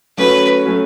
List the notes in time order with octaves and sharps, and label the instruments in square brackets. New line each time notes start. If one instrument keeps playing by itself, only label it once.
[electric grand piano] F#3 A3 C#4 F#4 [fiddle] B4
[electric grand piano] F#3 A3 C#4 F#4